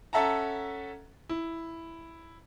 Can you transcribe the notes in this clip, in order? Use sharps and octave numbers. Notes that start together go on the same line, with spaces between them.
C#4 A4 E5 F#5 A5 A#5
E4